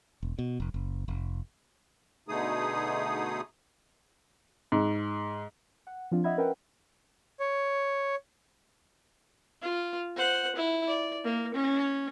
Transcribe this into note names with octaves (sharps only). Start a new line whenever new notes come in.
E1
B2
F1
F#1
F1
B2 D3 A3 D#4 G#4 D#6
G#2
F#5
F3 C4 D4 F4
D#5 E5 F#5 B5 G#6
C#4 A#4 B4 E5 F#5 G5
C#5
F4
C5 F#5
E4
D5
A#3
C#4